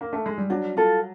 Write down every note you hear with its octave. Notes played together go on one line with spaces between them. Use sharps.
A#3
A3
G#3
G3
F#3 D4
F4 A4